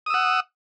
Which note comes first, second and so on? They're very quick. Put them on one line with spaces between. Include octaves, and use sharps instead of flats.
D#6 E6 F#5